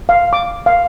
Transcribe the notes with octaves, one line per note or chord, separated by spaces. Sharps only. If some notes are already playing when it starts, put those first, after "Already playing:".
F5
D6
F5